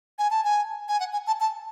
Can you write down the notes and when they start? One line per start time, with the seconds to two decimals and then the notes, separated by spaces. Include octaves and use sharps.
0.18 G#5
0.30 A5
0.44 G#5
0.88 G#5
1.00 F#5
1.13 G#5
1.27 A5
1.40 A5